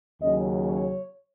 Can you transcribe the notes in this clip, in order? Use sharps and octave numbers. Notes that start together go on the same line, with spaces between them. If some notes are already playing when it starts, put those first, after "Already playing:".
D#2 C#3 F#3 C#4 D#5
C#5